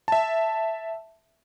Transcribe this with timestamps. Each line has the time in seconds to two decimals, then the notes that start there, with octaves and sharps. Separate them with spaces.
0.08 E5 A5